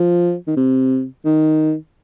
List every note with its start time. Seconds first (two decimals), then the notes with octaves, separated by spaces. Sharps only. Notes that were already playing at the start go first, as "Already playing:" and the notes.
Already playing: F3
0.47 D#3
0.56 C3
1.25 D#3